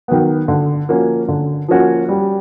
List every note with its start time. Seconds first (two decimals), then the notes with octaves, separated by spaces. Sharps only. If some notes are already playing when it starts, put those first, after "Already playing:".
0.08 D#3 F#3 B3
0.48 D3
0.89 F3 A#3 C#4 F#4
1.28 D3
1.68 F3 A#3 C#4 F#4
2.09 G3